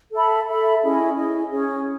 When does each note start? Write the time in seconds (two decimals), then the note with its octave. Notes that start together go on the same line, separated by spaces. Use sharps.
0.12 A4 E5 B5
0.47 A4 E5 B5
0.82 C#4 E4 G#4 D#5
1.16 C#4 E4 G#4 D#5
1.51 C#4 G#4 C#5